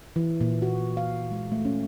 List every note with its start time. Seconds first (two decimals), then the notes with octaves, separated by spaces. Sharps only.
0.16 E3
0.41 A#2
0.62 F#4
0.97 F5
1.31 G#3
1.52 A3
1.65 C#4